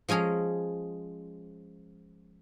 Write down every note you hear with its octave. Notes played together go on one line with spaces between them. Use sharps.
F3 G#3 C#4 G#4 A#5